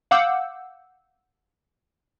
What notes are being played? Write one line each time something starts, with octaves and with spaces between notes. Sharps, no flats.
F5 F#5 D6 E6 G6